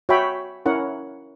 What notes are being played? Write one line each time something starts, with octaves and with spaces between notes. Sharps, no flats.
F#4 C#5 E5 G5 B5
C#4 E4 A#4 C#5 F#5